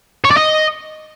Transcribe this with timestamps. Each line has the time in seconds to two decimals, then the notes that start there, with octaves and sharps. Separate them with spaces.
0.25 C#5
0.31 D5
0.37 D#5